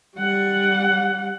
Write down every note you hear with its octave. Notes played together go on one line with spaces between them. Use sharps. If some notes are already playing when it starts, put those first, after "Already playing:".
G3 F#5